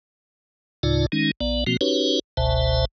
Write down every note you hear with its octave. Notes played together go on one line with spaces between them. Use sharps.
D2 A2 C#3 D#4 F4 D5
D#3 G#3 C#4 D#4
A#1 B3 D5
B2 F3 A#3 C4 F#4
C#4 D#4 F#4 G4 B4 C#5
G1 C#2 B2 C5 E5 A5